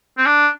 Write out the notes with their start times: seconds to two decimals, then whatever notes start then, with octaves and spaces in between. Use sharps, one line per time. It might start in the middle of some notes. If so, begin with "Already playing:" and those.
0.18 C4
0.26 D4